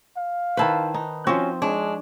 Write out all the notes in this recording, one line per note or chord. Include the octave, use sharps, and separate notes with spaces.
F5
D#3 E4 B4 C5 A5
D#4
F3 C4 C#4 F#4
G#3 D4 C#5